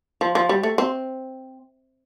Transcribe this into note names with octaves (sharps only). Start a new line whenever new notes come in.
F3
F3
G3
A3
C4